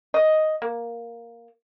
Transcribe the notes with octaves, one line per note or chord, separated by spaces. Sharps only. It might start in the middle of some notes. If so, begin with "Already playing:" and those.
D#5
A#3